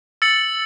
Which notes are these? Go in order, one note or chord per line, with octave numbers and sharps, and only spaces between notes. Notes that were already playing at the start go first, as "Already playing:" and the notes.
E6 A6 C#7 F#7